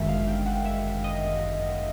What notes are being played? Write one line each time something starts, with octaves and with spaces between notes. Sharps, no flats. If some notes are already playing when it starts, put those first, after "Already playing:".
Already playing: G1 F#2 D#3 G#3 E5
F5
G5
F#5
E5
D#5